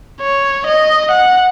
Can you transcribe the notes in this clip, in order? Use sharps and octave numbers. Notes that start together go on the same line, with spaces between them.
C#5
D#5
F#5